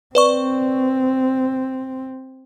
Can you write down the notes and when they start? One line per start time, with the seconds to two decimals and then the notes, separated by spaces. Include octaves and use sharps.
0.15 C4 B4 D5 C#6